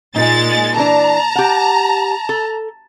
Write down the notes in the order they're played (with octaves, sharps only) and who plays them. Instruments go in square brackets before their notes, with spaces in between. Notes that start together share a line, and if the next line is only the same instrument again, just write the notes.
[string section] A#2 G#3 A6 [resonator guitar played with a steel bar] D#4
[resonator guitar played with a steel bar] E3 D4 [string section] A5 A#5
[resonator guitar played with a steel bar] G4 F#5
A4